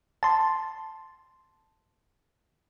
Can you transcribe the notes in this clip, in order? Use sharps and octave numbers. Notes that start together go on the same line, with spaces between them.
A5 C6